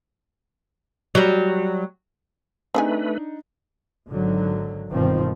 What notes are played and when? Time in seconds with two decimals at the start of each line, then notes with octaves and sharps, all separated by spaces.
1.15 F#3 G3
2.74 A3 C4 D4 D#4 G#4 B4 G#5
4.08 G#1 D3 D#3 F#3
4.89 G1 B2 D#3 F3 C4